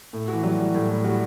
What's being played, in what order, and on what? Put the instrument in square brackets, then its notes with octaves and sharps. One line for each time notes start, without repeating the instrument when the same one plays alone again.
[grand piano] A2
[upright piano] E3 [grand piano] F#4
[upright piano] F#3 [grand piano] G3
[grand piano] G3
A2
A2
[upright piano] G3 [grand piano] F#4